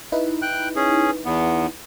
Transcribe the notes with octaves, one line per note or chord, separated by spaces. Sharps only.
D#4 E4 B4
G5 F#6
C#4 G#4
E2 B3